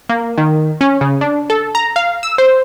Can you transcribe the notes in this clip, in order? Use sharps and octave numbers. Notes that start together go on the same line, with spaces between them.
A#3
D#3
C#4
C#3
D4
A4
A#5
F5
E6
C5